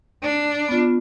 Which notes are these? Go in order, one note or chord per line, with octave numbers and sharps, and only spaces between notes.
D4
B3 F4